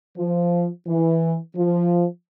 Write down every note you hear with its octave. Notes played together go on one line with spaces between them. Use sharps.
F3
E3
F3